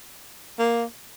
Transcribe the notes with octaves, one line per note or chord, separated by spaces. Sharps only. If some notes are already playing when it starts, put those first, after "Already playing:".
A#3